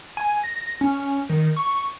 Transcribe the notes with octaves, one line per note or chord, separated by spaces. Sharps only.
G#5
A#6
C#4
D#3
C#6